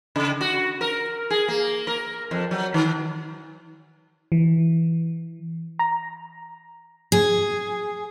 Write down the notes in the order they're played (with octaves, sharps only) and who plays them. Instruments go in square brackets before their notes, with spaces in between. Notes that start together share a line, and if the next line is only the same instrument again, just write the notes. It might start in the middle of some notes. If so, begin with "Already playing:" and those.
[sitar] C#3
F#4
A#4
G#4
A#3
A#4
F2
F#3
D#3
[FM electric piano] E3
A#5
[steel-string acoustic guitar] G#4